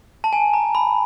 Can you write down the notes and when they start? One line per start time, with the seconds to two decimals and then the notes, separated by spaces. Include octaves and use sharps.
0.24 A5
0.33 G#5
0.54 A#5
0.75 B5